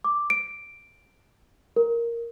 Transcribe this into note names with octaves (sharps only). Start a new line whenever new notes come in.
D6
D7
A#4